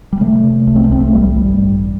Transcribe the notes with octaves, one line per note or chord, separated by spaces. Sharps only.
G3
C3 A3
C3
C2 A3
C4
A3
C2 C4
A3
A1 G3
A3
G2 G3
A1